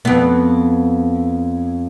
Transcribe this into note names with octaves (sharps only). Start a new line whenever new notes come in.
F2 B3